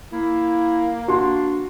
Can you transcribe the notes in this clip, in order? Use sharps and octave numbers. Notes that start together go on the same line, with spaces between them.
A#3 E4
D4 F#4 C6